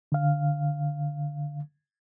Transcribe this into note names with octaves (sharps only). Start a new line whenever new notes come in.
D3 F5